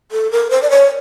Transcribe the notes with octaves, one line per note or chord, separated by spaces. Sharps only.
A4
A#4
C5
D5
C#5